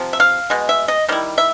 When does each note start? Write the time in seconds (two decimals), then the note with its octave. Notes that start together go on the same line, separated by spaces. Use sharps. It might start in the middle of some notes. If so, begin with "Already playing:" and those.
Already playing: C3 F3
0.13 E5
0.20 F5
0.50 B2 G#3
0.69 E5
0.88 D#5
1.08 D#3 G3 E4
1.38 E5